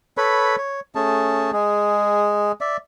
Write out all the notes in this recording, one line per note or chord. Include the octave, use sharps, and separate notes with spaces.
A4 B4 C#5 B5
C#5
A3 C#4 G#4 A5
G#3 G#4
D5 E5